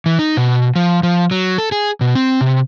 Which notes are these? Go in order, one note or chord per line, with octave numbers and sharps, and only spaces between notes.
E3
D#4
B2
F3
F3
F#3
A4
G#4
B2
C4
C3